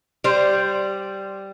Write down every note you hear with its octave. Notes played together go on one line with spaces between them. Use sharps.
G3 C5